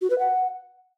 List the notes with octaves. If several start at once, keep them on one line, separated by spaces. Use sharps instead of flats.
F#4
B4
F#5